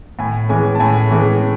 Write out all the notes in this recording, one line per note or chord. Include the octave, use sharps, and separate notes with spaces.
A2 G#5
E3 G#3 C#4 G#5
A5
A2 G#5
E3 G#3 C#4